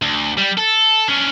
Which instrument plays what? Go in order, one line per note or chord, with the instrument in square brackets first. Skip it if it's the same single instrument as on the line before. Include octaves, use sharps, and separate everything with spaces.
[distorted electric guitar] D2
G3
A4
C#4 D4